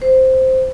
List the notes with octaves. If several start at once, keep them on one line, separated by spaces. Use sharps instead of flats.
C5